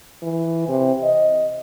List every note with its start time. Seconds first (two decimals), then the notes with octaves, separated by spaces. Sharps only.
0.23 E3
0.68 C3
1.03 D#5